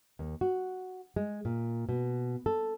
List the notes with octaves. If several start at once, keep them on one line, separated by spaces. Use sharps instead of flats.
D#2
F#4
G#3
A#2
B2
A4